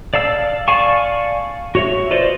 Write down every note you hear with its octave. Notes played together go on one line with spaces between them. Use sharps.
D5 F5 A5 E6
D5 F5 G#5 A5 C#6
F#4 C#5 E5
F4 B4 C5 D5 D#5